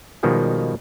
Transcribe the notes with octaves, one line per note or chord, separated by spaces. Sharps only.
B2 D#3 F3 G3 G#3